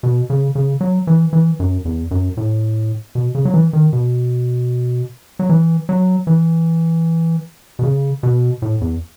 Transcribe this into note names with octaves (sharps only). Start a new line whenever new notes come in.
B2
C#3
C#3
F#3
E3
E3
F#2
E2
F#2
A2
B2
C#3
F#3
E3
D#3
B2
F#3
E3
F#3
E3
B2
C#3
B2
A2
E2